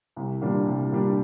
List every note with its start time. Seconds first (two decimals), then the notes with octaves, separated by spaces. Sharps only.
0.17 C2
0.42 A#2 G3 D4
0.67 C2
0.92 A#2 G3 D4